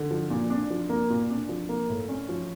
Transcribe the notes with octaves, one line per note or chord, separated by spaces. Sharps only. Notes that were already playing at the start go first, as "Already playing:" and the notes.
Already playing: D3
F3
A#2
D4
F3
A#3
A#2
D4
F3
A#3
A2
C#4
F3